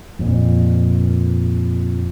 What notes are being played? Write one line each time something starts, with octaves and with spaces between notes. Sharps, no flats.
F2 A#2